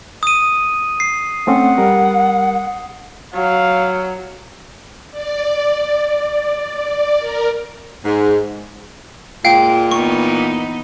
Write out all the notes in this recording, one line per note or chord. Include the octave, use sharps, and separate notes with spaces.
D#6 D#7
C7
A3 C4 C#4 F#5
G3 A#4
F#3 F5
D5
A#4
G#2
A#2 G#3 F5 G5
E3 B3 D#4 C#6